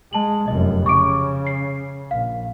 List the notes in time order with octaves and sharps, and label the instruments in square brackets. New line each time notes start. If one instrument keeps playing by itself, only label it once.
[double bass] G#3 [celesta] A5 F#7
[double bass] F1 F#2 [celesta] D#5
[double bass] C#3 [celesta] C#6 D6 D7
[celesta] C7
[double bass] A#1 [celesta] F5